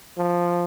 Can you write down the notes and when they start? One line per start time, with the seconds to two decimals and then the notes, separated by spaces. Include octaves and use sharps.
0.18 F3